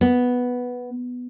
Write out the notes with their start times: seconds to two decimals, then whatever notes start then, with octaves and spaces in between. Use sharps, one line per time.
0.01 B3